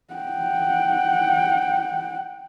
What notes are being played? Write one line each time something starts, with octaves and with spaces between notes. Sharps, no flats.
F#5 G5